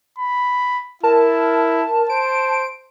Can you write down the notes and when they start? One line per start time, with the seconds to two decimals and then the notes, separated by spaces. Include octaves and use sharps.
0.19 B5
1.03 E4 A#4 A5
2.10 C5 D7